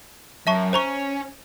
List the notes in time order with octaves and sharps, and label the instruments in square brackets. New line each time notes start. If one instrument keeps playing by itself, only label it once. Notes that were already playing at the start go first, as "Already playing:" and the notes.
[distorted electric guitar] F#2 [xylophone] E5 A5 C#6
[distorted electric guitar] C#4 [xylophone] C5 A#5 C#6